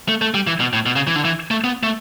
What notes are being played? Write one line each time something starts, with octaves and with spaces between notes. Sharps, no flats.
A3
A3
G3
E3
B2
A2
B2
C#3
E3
D3
E3
A3
B3
A3